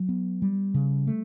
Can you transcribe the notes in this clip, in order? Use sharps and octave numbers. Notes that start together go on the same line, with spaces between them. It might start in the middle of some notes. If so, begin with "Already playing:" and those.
Already playing: F#3
B3
G3
C#3
A3